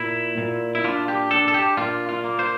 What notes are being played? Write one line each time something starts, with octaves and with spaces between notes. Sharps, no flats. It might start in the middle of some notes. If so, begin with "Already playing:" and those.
Already playing: A#2 E4
A#2
E4
D4 F4
G4
D4 A4
A4
G4
A#2 F4
F4
A#3
C5